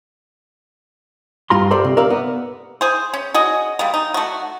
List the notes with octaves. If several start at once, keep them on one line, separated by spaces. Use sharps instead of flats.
G2 F4 A#5 C6
G4 A4 C5 D5 E5 A#5
C3
A#4 D5 E5 F5
B3
G#4 C5
C#4
F#4 G#4 D#5
G3 G#3 A#3
D#4
A3 F#4